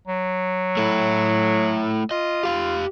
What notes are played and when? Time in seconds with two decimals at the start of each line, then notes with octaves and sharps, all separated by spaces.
0.07 F#3
0.77 A3 E4
2.11 F4 D#5
2.43 G4 F5